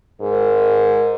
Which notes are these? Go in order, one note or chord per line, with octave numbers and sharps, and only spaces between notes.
G#2 A#4